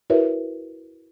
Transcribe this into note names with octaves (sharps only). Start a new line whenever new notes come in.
E4 F#4 A#4 B4 C#5 E5